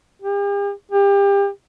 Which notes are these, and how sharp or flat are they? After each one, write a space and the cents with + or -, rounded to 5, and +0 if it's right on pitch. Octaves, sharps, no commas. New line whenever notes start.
G4 +45
G4 +30